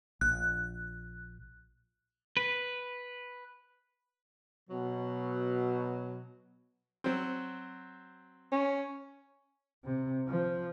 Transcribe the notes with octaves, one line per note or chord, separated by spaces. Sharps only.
A#1 F#6
B4
B2 F#3
F#3 C4
C#4
C3
F3